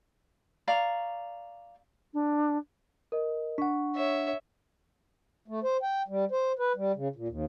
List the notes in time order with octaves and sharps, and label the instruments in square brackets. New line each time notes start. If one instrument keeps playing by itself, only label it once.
[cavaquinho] D5 F5 A#5 C#6
[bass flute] D4
[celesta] A#4 D#5
[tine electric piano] D4 F#5 [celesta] C#6
[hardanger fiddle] C#5 E5
[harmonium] A3
C5
G5
G3
C5
B4
G3
C#3
A#2
D#2